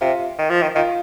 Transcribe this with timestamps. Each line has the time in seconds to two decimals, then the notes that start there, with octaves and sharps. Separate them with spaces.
0.01 C3 F4
0.39 D#3
0.50 F3
0.62 D#3
0.75 D#3 F4